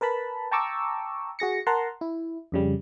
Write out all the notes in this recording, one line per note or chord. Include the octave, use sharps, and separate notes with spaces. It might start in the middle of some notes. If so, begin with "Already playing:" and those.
A#4 B4 A5 B5
G5 A5 A#5 C#6 D6 E6
F#4 G#4 A#6 C#7
A#4 F#5 A5 A#5 C6
E4
F2 C#3 G3